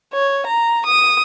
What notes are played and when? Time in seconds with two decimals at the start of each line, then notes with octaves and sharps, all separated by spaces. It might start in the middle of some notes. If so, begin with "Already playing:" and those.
0.13 C#5
0.46 A#5
0.86 D#6